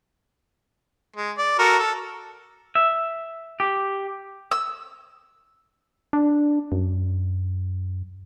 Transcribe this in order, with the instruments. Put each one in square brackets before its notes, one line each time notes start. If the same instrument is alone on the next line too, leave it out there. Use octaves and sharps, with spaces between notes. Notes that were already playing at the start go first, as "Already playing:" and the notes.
[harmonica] G#3
D5
F#4 A4 A#4
A4
[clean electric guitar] E5
G4
[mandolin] E6
[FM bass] D4
F#2